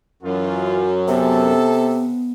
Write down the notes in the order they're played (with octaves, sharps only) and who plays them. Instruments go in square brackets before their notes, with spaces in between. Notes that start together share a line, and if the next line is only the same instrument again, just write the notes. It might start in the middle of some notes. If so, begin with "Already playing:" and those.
[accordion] F#2 [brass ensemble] E3 F4
[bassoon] C3 [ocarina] B3 [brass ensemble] A4